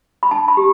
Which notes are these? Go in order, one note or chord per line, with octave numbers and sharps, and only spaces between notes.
B5
D4 A5
B5
G4